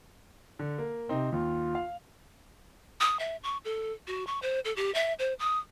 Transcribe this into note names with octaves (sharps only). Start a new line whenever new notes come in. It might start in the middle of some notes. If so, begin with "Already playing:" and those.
D3
A#3
C3 C4 D#4
D#2 F4
F5
D#6
E5
C#6
A4
F#4
C#6
C5
A4
G4
E5
C5
D#6